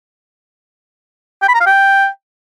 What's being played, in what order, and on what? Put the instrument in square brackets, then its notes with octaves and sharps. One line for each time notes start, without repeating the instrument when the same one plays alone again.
[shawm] G5
B5
A#5
F5
G5